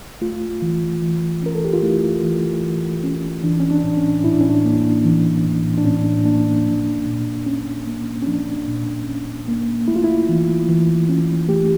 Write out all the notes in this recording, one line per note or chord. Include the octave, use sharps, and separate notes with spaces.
A3 F4
E3
E3
C#4 A#4
A4
G4
F4
A3 E4
E3
E3
C#4
E3 D4
C#4
D4
A2
C#4
A2 E4
D4
C#4
D4
A#3
E3
A2
D4
A2 C#4
A#3 D4
F3
A#2
C#4
A#3
C#4
F3 D4
A#2
C#4
A#3
A3 E4
F4
E4
E3
E3
C#4
A3 G4